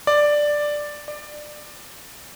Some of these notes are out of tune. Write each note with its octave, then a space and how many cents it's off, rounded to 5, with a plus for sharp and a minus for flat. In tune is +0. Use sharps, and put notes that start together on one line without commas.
D5 +5
D5 +20